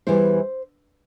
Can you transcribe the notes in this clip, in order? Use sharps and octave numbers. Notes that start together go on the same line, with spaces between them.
E2 E3 G3 E4 C5